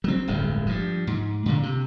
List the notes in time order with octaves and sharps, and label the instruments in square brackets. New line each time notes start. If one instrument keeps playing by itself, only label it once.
[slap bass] F#3 C4
D1 G1 F2 G#3
G2 F3
G#2
A#2 D3
C3